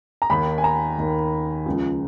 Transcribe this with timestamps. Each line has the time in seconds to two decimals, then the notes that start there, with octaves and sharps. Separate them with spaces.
0.22 A#5
0.30 D#2 D#3 B5
0.58 G#5
0.64 A#5
0.98 D#2 D#3
1.66 C#2 C#3 F3